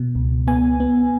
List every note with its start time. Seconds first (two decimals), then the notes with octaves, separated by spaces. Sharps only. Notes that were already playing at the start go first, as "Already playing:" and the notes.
Already playing: B2
0.15 C#2
0.47 B3 G#5
0.80 B3